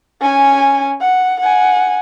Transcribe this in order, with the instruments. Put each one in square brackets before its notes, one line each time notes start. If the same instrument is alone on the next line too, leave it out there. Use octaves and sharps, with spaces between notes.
[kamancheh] C#4 G#5
F#5
F#5 G#5